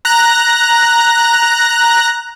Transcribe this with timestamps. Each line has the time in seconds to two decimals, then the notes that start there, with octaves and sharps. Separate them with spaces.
0.05 A#5 F#6 A#6